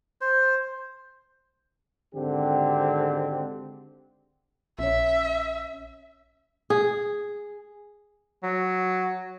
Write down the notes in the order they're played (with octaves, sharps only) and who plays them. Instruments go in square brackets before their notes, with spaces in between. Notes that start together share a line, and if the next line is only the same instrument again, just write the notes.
[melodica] C5
[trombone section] G#1 D3 G#3 C4 G4
[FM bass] A#1 [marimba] C#4 C#5 [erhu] E5
[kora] G#4
[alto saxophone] F#3